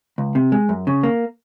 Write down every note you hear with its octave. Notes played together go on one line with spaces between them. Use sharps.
C#2
C3
G#3
F#2
C#3
A#3